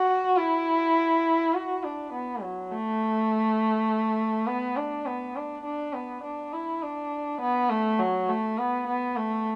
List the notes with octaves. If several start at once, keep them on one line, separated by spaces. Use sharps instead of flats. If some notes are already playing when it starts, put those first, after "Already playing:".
Already playing: F#4
E4
F#4
D4
B3
F#3
A3
B3
D4
B3
D4
D4
B3
D4
E4
D4
B3
A3
F#3
A3
B3
B3
A3